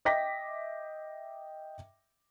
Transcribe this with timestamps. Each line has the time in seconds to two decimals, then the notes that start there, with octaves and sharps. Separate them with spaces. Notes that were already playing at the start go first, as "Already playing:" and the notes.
0.05 D#5 E5 G5 D6 A#6 B6